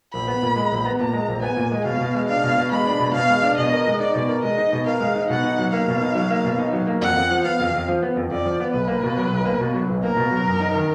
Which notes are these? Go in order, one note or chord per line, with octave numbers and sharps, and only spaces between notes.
A#1 B5
B3
A#2
G#3
A#1
B3
A#2 A#5
G#3
A#1
B3 G#5
A#2
G#3
B2 F5
B2
G#3
D4 F5
B2
B2
G#3 B5
D4
B2
B2 F5
G#3
D4
B2 D#5
A#4
G#3
D#4 D5
B2
A#4
G#3 D#5
D#4
B2
A#4 F5
G#3
D#4
B2 F#5
D#4
F#3
A#3 F5
B2
D#4
F#3
A#3
B2
D#4
F#3
A#3
F2 F#5
F2
F3
B3 F5
F2
F2
F3
B3
F2
F2 D5
F3
B3
B1 B4
A#3
B2
F#3
B1
A#3
B2
F#3
B1
A#3 A#4
B2
F#3
F#2
D#4
D#3